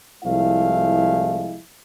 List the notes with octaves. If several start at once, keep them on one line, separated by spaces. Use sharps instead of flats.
C2 F3 G#3 A3 E4 F5